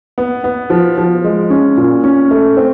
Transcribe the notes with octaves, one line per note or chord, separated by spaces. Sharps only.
B3
B3
F3
F3
G#3
C#4
A#2
C#4
A3
C4